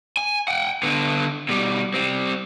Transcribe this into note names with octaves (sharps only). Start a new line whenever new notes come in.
G#5
F#5 G5
D3 B3
B2 G3
G3 C4